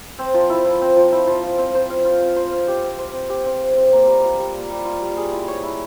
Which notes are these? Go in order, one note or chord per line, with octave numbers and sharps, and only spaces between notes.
C4
F3
E4
F3
C4
F3
E4
F3
F4
C4
C5
F5
F4
C4
C5
F5
G4
C4
C5
C4
G4
C4
C5
C4
A#3
G3
F4
G3
A#3
G3
F4
G3
G#4
E4
C#5
E4